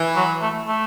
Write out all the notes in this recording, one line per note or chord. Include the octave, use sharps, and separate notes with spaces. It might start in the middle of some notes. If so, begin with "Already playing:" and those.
Already playing: E3
F#3
A3
A3